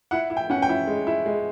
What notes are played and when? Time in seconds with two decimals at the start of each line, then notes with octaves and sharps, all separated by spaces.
0.11 E4 F#5
0.30 E4
0.37 G5
0.50 C#4 F#5
0.62 G5
0.69 E4
0.87 G#3
1.07 E4
1.26 G#3